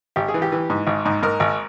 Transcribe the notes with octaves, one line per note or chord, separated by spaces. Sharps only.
G#1 G4
G#4
E3
G4
E3
G#2
G#1
G#2
G#2 A#4
G#1